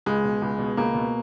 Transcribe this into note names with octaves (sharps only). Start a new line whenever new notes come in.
C#2 G#3
B2
C#2
B2
C#2 A#3
B2